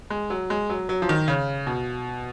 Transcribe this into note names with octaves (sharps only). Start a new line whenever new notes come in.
G#3
F#3
G#3
F#3
F#3
F3
D#3
C#3
B2